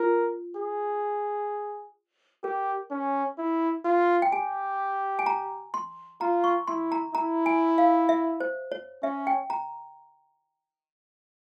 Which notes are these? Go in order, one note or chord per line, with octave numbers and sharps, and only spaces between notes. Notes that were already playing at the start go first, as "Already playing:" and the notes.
Already playing: F4 A#4
G#4
G4 A#4
C#4
E4
F4
G5
G4 G#5
G#5
A#5
C6
F4 A#5
C#6
E4 C6
A#5
E4 A#5
G#5
F5
E5
C5
C#5
C#4 E5
G5
A#5